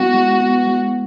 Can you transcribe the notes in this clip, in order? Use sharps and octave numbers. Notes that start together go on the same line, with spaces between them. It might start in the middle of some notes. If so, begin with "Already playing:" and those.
Already playing: G#3 B3 E4 F#4
G#3
B3
G#3